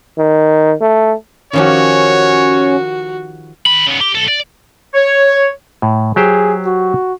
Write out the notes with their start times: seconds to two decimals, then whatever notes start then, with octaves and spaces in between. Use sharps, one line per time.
0.18 D#3
0.81 A3
1.53 D#3 F3 C#4 F#4 G4 C#5
3.66 D#3 B5
3.86 C#3 B3
4.01 G4
4.15 B1 A4
4.28 D5
4.94 C#5
5.82 A2
6.16 F#3 G4 G#4 C5
6.66 F#4